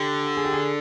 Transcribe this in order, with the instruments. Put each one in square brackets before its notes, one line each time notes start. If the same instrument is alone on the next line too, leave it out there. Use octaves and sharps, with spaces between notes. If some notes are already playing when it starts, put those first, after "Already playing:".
Already playing: [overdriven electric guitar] D3 [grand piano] G4
[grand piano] G#4
G4
G#4